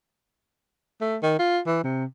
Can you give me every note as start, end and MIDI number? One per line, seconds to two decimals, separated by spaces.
1.01 1.17 57
1.23 1.36 51
1.39 1.59 65
1.66 1.82 52
1.84 2.05 48